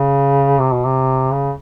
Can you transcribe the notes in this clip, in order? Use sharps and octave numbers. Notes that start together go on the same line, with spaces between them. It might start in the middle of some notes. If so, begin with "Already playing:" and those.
Already playing: C#3
C3
B2
C3
C#3